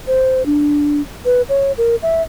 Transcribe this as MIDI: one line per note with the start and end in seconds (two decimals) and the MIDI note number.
0.07 0.45 72
0.46 1.01 62
1.25 1.42 71
1.49 1.72 73
1.78 1.96 70
2.02 2.22 76